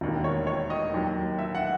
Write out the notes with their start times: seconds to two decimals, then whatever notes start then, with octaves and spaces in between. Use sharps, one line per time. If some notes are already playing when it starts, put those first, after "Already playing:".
0.01 E1 D#2 D#3
0.24 C#5
0.47 C#5
0.70 D#5
0.94 D#2 D#3 F#3
1.39 E5
1.55 F#5